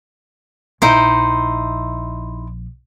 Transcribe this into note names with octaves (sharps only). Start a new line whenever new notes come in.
A#1 D#4 E4 C5